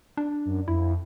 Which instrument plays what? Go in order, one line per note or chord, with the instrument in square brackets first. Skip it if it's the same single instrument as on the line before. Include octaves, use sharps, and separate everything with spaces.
[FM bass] D4
[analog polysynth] F#2
[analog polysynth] F2 [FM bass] E4